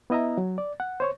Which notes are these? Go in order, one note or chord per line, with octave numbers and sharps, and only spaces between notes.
B3 E4 D#5 E5 A#5
F#3
D5
F#5
C5 C#5 C#6